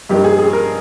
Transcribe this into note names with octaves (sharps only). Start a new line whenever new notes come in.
G2 F3 A#3 D#4 G4
G#4
G#4
A#4